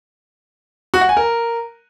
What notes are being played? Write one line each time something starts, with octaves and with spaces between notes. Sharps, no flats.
F#4
F#5
G#5
A#4